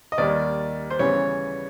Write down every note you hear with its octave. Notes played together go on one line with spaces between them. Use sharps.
D#5
D#2 D#3 G3 D5
C5
C#3 E3 G3 B3 C#5